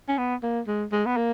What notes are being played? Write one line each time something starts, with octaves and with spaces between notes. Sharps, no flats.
C#4
B3
A#3
G#3
G#3
B3
A#3